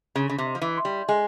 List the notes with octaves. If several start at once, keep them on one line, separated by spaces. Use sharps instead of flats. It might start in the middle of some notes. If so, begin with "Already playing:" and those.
C#3 C6
C#3
C3
D#5
F3
E3
C6
G3
G#3 G#5